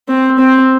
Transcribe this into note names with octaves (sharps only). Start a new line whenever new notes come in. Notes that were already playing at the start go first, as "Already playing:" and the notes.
C4
C4